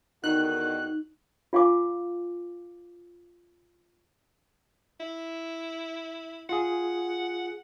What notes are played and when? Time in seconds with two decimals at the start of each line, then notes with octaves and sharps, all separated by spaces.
0.24 E2 D3 D#3 D#4 F#4 F#6
1.53 F4 F5 G#5 D6
5.00 E4
6.49 F4 G#4 F#5